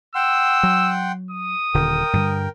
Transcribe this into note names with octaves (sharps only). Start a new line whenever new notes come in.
F#5 G5 C6 E6
F#3
D#6
D#1 D3 A#4 G5
G2 D3 G3